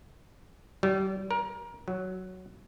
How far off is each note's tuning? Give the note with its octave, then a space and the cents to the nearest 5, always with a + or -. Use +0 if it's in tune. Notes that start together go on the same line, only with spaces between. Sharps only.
G3 -35
A#4 +25
F#3 +5